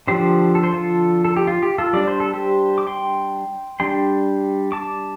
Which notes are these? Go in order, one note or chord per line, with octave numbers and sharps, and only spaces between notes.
D3 F3 D4 G4 C5
A4
C5
F4 A4
A4
G4
F4
G4
F4 A4
G3 D4 D5
C5
A4
G4 C5
D6
G5 C6
G3 D4 G5 C6
A5 D6